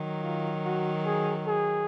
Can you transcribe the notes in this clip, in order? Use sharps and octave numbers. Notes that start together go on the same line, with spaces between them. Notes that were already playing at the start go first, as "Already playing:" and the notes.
Already playing: D#3 F#3
F4
F#4
G#4
G#4